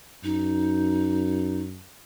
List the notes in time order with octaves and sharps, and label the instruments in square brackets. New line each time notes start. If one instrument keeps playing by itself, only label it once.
[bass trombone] F#2 [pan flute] D#4